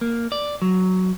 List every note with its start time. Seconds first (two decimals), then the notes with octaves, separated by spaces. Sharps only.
0.01 A#3
0.32 D5
0.62 F#3